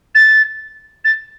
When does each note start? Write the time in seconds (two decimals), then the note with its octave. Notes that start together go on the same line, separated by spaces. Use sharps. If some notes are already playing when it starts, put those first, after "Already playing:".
0.15 A6
1.04 A6